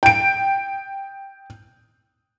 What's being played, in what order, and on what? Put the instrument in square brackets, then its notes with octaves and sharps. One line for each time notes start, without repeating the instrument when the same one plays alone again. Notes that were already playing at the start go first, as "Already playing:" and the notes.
[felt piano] G5 D7